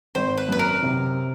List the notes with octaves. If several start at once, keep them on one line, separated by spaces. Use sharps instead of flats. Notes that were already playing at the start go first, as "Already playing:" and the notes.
G#1 C5
B4
F#2 B4
A#4
C3